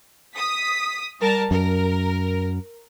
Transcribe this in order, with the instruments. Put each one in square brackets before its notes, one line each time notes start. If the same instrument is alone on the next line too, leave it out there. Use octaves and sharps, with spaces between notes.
[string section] D#6 B6
G3 A#4 A5
[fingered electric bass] F#2 [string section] A#4